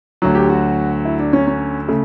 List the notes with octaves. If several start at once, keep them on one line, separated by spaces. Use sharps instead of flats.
D2 D3 F#3
G4
F#4
E4
D4
C#4
C#4
C#3 A3